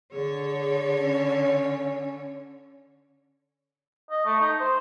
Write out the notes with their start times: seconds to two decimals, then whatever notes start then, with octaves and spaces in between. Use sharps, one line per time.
0.12 D3 G#4 C#5
0.99 C#4
4.10 D#5
4.25 A3
4.40 D#4
4.60 C5